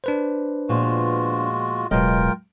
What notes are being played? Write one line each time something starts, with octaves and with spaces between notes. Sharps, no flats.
D4 B4 C5
A#2 F3 G#3 B3 F4 F#4
D1 B2 F#3 G#3 F4 A#4 D#5 G5